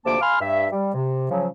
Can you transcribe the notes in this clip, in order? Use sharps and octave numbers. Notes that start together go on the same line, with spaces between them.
D2 C3 F3 A#3 A5 D6
F5 G#5 B5 C6 F6
G2 E5
G3
C3
C#3 F3 F#3